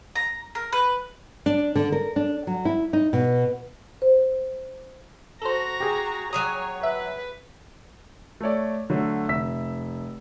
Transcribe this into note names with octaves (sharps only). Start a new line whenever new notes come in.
A#5
A#4
B4
D4
D3
A#4
D4
F#3
E4
D#4
B2
C5
F#4 A4 C5 A#5
G4 G#4
F#3 C#5 G#5 A#5 D#6
B4 E5
A3 A4 C#5 D5
D3 F#3 A3
F1 E5 E6 B6